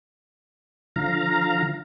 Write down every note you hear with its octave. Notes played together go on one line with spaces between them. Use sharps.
D3 F3 F5 A#5